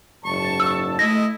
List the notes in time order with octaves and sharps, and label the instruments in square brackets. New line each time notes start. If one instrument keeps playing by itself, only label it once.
[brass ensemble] F#1 G#2 A5 [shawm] C#6
[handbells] E6
[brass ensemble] A3 D#5 [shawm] E4 [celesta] A#6